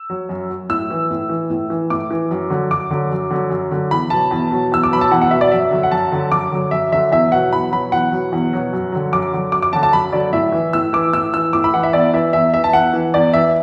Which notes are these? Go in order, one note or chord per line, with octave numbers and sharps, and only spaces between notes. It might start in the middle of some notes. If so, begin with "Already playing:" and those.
Already playing: E6
F#3
F#2
F#3
A2 E6
E3
A2
E3
A2
E3
A2 D6
E3
F#2
D3 F#3
F#2 D6
D3 F#3
F#2
D3 F#3
F#2
D3 F#3
E2 B5
B2 F#3 A5
E2
B2 F#3
E2 E6
D6
B2 F#3 B5
A5
E2 F#5
F#5
B2 F#3 E5
D5
F#2 E5
D3 F#3
F#5
F#2 A5
D3 F#3
F#2 D6
D3 F#3
F#2 E5
D3 F#3 E5
E2 E5
B2 F#3 F#5
E2 B5
B2 F#3 B5
E2 F#5
B2 F#3
E2
B2 F#3
F#2
D3 F#3
F#2 D6
D3 F#3
F#2 D6
D6
D3 F#3 A5
A5
F#2 B5
D3 F#3 D5
A2 E5
E3
A2 E6
E3 D6
A2 E6
E3 E6
A2 D6
B5
E3 F#5
E5
E2 D5
E3 E5
E2 E5
E3 E5
A5
E2 F#5
E3
E2 D5
E3 E5